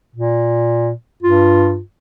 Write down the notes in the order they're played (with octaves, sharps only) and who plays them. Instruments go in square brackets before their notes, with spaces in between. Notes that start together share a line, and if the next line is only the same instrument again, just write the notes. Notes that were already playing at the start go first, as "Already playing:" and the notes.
[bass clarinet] A#2
[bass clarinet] G2 [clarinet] F4